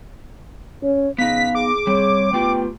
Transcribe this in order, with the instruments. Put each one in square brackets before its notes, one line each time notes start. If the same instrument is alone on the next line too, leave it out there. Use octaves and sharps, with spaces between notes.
[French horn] C#4 [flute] C#5
[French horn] C#3 [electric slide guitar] B3 D#4 [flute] F5 [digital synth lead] B6
[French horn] G#4 [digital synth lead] D6
[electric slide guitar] G3 C4 [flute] C#5
[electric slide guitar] A3 F4 G4 [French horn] B3 [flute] G5